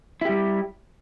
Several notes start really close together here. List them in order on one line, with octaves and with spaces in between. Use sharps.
E4 G4 G3